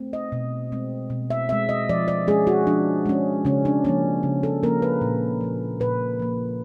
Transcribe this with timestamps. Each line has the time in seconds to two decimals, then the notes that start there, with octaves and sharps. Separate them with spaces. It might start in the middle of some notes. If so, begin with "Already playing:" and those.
Already playing: A3 C4
0.13 D#5
0.32 B2
0.72 G#3 C4
1.10 B2
1.30 E5
1.49 G#3 C4 E5
1.69 D#5
1.89 F3 D5
2.08 D5
2.27 G#3 C#4 G#4
2.47 F#4
2.67 F3 D4
3.06 G#3 C#4
3.45 C#3 C#4
3.65 D4
3.85 F3 A#3 C#4
4.23 C#3
4.43 A4
4.63 F3 A#3 C#4 A#4
4.82 B4
5.01 A#2
5.41 F3 A#3
5.80 A#2 B4
6.20 F3 A#3